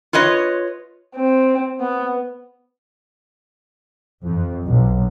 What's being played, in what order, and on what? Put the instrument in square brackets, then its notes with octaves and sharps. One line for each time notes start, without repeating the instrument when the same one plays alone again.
[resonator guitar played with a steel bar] F4 B4 C#5 D#5
[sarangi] C4
B3
[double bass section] F2
B1